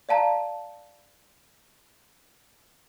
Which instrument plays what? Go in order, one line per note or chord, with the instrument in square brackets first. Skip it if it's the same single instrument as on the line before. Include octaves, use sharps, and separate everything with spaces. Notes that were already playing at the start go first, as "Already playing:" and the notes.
[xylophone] D5 F5 A5 A#5